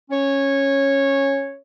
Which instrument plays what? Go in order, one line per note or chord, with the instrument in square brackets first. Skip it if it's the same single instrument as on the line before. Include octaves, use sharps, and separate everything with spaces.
[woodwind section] C#4 C#5